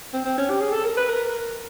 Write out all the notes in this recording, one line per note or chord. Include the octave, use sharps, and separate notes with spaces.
C4
C4
C#4
G4
G#4
A4
A#4
B4
A#4